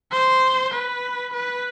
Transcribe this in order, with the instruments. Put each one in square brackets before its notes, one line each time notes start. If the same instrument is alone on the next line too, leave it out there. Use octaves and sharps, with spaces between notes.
[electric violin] C5
B4
B4